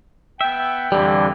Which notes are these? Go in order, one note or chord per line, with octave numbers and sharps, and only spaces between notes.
B3 E5 G5
F2 D3 E3 G3 D4 G4